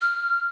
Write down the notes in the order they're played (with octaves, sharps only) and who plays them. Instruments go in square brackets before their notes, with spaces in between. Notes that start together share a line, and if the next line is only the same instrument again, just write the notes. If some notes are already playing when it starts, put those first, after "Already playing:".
[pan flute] F6